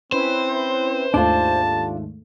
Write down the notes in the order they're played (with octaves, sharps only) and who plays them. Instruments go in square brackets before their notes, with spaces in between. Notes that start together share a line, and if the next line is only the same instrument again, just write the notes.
[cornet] C4 [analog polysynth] C#4 E4 B4 [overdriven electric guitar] C5
[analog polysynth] D#2 G#2 A3 [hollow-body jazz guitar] D4 F4 [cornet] A5